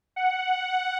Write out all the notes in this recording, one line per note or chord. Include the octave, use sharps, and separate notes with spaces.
F#5